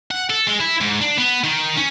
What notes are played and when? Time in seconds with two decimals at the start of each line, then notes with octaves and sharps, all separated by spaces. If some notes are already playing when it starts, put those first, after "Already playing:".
0.11 F#5
0.30 A4
0.47 G#3
0.60 E4
0.81 G#2
1.01 D4
1.17 B3
1.44 D#3
1.76 C#4